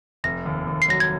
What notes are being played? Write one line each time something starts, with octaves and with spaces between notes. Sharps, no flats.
F1 A#6
D#2
D#2
C7
F#3 A#6
G#6